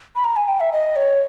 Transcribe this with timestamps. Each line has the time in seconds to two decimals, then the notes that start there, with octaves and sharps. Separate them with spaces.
0.15 B5
0.24 A#5
0.36 G#5
0.48 G5
0.60 E5
0.72 D#5
0.96 C#5